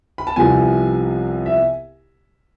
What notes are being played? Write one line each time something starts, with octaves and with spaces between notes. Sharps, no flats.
B5
A5
C2 C3 F3 B3 G#5
E5